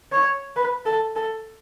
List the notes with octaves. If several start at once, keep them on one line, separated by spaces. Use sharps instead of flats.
C#5
B4
A4
A4